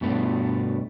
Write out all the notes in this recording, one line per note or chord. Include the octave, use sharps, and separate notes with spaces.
G2 B2 A3 B3